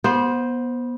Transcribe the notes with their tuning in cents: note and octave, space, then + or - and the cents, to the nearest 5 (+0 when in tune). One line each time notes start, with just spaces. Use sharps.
B3 -25 C5 +0